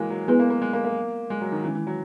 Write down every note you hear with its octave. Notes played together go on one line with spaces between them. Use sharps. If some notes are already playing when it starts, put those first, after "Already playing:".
Already playing: E3 F#3 G#3 A#3
F#3
G#3 B3 E4 G#4 B4
A#3
A#3
G#3
A#3
A#3
G#3
F#3
D#3
D#3 E3 G#3 C#4 E4
E3
F#3